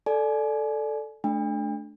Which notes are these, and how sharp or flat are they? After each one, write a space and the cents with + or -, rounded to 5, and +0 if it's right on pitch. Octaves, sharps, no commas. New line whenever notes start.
A4 +0 D5 +0 G#5 +30
A3 -30 D4 +0 G5 +40